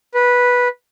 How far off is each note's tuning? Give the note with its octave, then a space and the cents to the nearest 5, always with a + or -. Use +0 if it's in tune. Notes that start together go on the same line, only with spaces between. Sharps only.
B4 -10